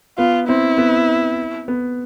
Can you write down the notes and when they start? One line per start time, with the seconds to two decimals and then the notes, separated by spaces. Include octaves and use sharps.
0.18 B3 F4
0.48 C4 E4
0.78 B3
1.68 B3